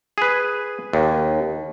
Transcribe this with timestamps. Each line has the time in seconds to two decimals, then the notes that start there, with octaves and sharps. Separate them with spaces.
0.18 G#4 B4
0.93 D#2